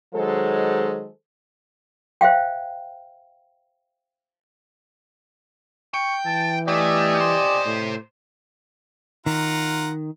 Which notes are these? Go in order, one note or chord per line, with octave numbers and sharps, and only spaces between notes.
D#3 F#3 G#3 A4 C5
C5 E5 F5 G5
G5 C#6
E3 A5
A3 G4 D5 D#5 G#5
C3 C5
A2
D#3 F4 F#5 A#5